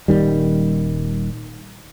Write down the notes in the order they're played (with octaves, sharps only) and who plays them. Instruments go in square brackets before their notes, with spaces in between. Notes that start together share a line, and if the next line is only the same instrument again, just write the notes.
[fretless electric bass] D#1 D#2 D#3 G3